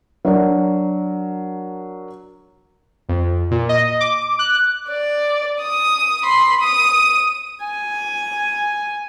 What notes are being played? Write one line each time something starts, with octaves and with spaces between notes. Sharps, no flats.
F#3 D4 A#4
F2
A#2
D#5
D6
F#6
D5
D#6
B5 C6
D#6 D#7
G#5